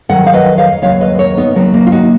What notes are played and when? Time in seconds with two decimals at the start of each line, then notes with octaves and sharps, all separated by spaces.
0.09 F2 D#3 F#3 F#5
0.26 F5
0.33 B4 D#5
0.58 C#5 F5
0.82 D#2 C#3 F#3 C#5 F5
1.01 B4 D#5
1.15 B4
1.19 A#4 C#5
1.37 B3 D#4
1.55 D#2 C#3 F#3 A#3 C#4
1.74 A#3
1.87 F4
1.92 D#4 F#4